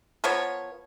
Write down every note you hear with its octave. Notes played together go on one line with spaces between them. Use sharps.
F3 B3 A#4 C#5